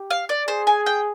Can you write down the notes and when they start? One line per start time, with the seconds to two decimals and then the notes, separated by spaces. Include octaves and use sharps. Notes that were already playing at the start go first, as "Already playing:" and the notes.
Already playing: G4
0.11 F5
0.29 D5
0.48 G#4 C5
0.67 G#5
0.86 G5